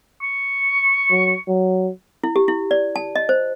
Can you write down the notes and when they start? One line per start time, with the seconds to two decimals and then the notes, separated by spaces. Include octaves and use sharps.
0.23 C#6
1.11 F#3
1.48 F#3
2.24 E4
2.36 G4
2.48 E4
2.71 D5
2.96 A5
3.15 D#5
3.29 C5